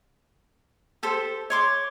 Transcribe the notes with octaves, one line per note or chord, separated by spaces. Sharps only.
G4 A4 C5
C#5 C6 D6